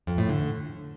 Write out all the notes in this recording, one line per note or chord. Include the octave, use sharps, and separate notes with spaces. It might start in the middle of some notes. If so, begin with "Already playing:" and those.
F2
A2
D3